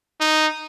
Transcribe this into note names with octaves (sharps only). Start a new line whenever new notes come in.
D#4